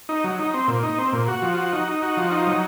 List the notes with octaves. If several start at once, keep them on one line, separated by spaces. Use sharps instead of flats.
D#4
F#3
D#4
C4
A#2
D#4
C4
A#2
F#4
F3
F#4
D#4
D#4
F#4
F3
D#4
F#3